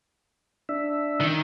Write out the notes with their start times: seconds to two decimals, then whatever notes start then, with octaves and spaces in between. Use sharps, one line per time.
0.69 D4 E5
1.21 D#3